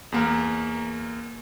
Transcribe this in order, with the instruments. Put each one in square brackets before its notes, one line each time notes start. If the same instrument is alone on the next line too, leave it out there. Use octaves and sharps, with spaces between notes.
[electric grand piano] E2 A#3 A#4